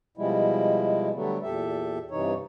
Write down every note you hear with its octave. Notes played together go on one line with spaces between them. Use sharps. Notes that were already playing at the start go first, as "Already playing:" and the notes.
B2 F3 G3 G#3 E4
D3 F#3 G3 A3 B3
E2 A#2 G4 A4 E5
G2 C3 E3 D#4 C#5